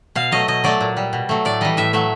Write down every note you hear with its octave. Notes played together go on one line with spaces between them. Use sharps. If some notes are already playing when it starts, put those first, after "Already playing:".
B2 F5
F#3 A3 D#5
B2 D#5
F#3 A3 D5
A#2
G3
B2
F#3 A3
A2 D5
E3 G3 D#5
A2 E5
F#3 A3 E5